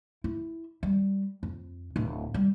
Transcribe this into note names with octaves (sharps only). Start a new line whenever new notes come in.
E4
G3
F2
D1
G3